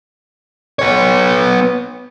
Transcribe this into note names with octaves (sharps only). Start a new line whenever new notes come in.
B3 C#5